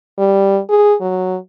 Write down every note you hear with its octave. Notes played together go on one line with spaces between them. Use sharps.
G3
G#4
F#3